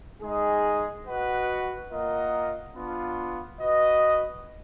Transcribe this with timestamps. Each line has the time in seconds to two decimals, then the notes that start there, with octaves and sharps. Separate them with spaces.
0.20 G#3 D#4 G#4 D#5
1.05 F#4 B4 D#5 F#5
1.90 A#3 F4 A#4 D#5 F#5
2.74 B3 D4 F4
3.58 F#4 B4 D#5